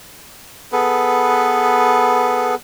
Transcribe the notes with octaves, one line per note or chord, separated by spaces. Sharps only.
B3 G#4 A4 B4